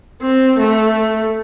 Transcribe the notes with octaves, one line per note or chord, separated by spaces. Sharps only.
C4
A3